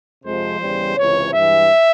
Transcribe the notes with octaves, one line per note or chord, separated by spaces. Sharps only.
F2 C3 F3 G#3 C5
E2 C#3 G3
C#2 C3 E3 C#5
G2 E3 G#3 E5